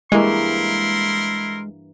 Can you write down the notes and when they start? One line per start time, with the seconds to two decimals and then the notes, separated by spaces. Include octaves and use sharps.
0.12 G2 E3 G#3 A#3 E4 A#4 C6